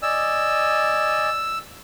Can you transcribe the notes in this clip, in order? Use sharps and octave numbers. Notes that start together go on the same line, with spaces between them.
D5 D#5 G#5 E6